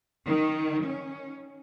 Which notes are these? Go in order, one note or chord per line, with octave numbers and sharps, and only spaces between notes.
D#3
C#4